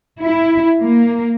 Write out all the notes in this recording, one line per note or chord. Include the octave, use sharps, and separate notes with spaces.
E4
A#3